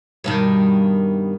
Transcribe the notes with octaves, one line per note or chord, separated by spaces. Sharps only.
G2 B2 D#3